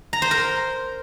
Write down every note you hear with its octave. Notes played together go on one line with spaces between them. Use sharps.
A#5
C5
A#4